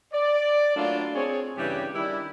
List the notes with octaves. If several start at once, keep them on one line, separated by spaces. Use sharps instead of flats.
D5
F#3 A3 A#3 D4 E4 F4
C4 G#4 C#5
G2 C#3 E3 G3 G4
D#3 G3 D4 E4